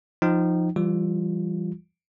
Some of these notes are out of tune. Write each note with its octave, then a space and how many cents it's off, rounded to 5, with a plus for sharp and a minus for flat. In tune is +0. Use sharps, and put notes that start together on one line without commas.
F3 +0 D#4 +0 G5 -30
E3 +30 G3 +0 F4 +0